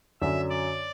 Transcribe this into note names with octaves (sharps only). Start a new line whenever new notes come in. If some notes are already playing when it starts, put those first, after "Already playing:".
F#2 D3 F#3 C#4 E5
D5